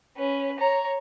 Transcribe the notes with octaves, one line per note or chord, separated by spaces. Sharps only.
C#4 B4
C#5 A#5